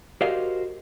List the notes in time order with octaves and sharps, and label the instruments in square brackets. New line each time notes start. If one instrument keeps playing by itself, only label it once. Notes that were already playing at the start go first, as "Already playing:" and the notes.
[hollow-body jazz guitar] F#4 G4 A#4 C5 D#5 F5